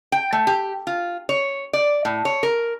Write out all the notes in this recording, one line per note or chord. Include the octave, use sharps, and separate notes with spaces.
G5
A3
G4
F4
C#5
D5
A2
C#5
A#4